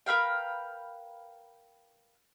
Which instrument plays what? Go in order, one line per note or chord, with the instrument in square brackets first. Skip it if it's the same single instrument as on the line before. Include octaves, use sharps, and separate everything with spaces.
[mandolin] A#4 B4 F5 G5